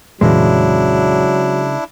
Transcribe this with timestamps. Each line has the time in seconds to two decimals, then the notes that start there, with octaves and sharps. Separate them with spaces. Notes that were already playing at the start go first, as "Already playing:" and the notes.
0.21 F1 A#2 C#3 E3 F#3 G#3 D4 E4